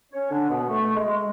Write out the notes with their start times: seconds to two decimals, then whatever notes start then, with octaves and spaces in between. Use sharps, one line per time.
0.12 C#4 C#5
0.30 D3 D4
0.49 B2 B3
0.69 A3
0.95 G#3